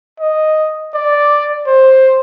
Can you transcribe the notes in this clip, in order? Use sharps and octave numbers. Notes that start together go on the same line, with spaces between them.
D#5
D5
C5